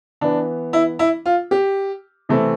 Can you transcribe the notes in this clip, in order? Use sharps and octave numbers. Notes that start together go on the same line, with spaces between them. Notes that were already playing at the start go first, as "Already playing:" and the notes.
E3 B3 D4
E4
E4
F4
G4
C3 E3 A3 C4